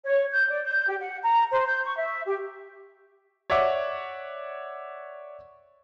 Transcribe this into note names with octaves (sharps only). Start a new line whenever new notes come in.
C#5
G6
D5
G6
G4
F#5
A#5
C5
G6
C#6
E5
G4
C#5 D5 E5 F#5 D6